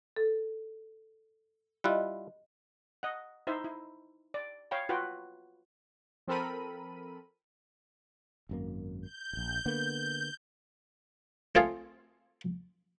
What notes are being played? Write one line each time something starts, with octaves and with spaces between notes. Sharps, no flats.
A4
G3 E4 F4 D#5 F#6
D#5 F#5
D#4 E4 C5 E5
E4
D5
C#5 F5 G5 B5
F4 F#4 B4 G5
F3 C4 A4 A#4 B5 D#7
G#1 F#2 A#3
G6
D#1 A#1
D3 A#3 B3
A3 C4 F4 G#4 A4 F5